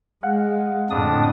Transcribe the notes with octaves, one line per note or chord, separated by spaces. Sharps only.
G#3 F5 F#5
F2 A2 D3 D4 D#6